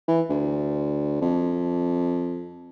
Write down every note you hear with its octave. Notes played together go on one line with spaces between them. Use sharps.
E3
D2
F2